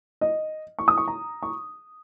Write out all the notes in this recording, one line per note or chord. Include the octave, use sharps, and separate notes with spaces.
D#5
C#6
D#6
C#6
A#5
C#6